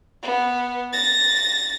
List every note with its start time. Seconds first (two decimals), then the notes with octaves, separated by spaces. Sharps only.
0.23 B3
0.93 A6 A#6